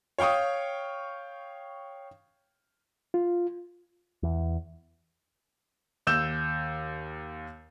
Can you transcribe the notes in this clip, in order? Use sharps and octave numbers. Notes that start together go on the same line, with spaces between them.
C#5 F5 G5 C#6 D#6
F4
E2
D#2 E6 G6 E7